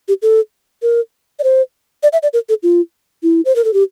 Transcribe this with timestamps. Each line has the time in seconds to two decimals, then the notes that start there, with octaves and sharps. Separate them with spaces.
0.08 G4
0.22 A4
0.82 A#4
1.39 D5
1.44 C5
2.03 D5
2.13 E5
2.23 D5
2.33 A#4
2.49 A4
2.63 F4
3.23 E4
3.45 C5
3.56 A#4
3.64 A4
3.74 G4